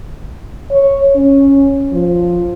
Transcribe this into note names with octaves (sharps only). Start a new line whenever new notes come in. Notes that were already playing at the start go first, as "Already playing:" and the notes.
C#5
C#4
F3